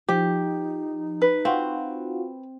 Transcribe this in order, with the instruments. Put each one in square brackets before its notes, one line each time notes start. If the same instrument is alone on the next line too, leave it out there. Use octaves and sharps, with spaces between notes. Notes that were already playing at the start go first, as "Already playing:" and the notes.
[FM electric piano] F3 [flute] D#4 [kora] G4
[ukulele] B4
[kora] C4 [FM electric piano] F4 F#4